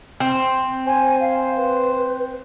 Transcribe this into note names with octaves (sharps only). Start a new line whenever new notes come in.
C4
C5 G#5
F5
B4